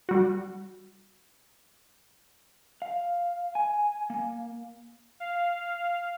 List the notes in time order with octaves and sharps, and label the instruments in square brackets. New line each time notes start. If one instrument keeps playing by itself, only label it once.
[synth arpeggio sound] G3 F#4
[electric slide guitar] F5
G#5
A#3
[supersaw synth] F5